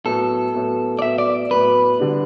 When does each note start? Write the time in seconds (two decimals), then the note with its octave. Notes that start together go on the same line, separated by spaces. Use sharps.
0.06 A2 F#3 B3 A4
0.55 A2 F#3 B3
0.99 D5
1.02 A2 F#3 B3 E5
1.18 D5
1.51 A2 F#3 B3 B4
1.99 D3 G3 D4